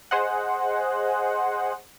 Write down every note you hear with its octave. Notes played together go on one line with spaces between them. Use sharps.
G#4 C5 D#5 F#5